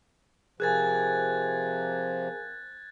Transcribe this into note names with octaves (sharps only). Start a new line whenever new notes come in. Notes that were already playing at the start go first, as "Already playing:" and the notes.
C3 F3 G#4 A#4 G#5 F#6 G#6 A6